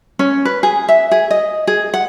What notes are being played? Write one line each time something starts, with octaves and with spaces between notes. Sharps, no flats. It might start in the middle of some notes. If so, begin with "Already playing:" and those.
C#4
B4
G#4
E5
G#4
D#5
G#4
F#5